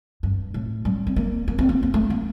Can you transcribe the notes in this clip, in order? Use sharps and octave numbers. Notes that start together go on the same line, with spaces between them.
G2
A2
G3
C4
A#3
A#3
C4
A#3
A#3
A3
A#3